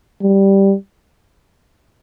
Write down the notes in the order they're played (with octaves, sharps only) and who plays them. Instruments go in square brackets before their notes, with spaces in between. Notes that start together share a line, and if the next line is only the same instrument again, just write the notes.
[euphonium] G3